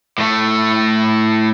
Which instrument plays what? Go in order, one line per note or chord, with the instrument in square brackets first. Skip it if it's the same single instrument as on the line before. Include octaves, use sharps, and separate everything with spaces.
[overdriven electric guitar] A2 A3